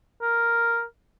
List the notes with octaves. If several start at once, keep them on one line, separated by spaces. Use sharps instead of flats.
A#4